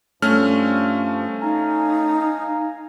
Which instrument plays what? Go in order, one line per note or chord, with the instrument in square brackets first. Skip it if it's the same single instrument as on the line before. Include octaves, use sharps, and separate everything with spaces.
[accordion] G2 F3 [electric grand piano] A3 C#4 F6
[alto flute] D#4 [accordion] F5 G#5 A#5